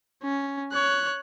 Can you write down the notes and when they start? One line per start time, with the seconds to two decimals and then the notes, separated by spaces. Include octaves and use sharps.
0.23 C#4
0.72 C#5 F#6